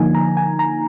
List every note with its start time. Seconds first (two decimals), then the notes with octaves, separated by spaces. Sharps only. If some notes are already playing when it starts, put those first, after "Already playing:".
Already playing: D3 F3 A#3 D#4 G#5
0.15 A#5
0.37 G#5
0.59 A#5